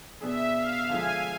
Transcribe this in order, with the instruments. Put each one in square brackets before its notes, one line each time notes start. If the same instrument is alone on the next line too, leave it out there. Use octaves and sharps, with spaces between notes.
[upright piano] B2 B3 D4 G#4 [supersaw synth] E5
[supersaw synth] F5
[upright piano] D3 F3 G#3 [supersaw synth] G#5